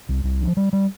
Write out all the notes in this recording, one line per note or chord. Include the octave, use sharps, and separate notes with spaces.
C2
C2
F3
G3
G3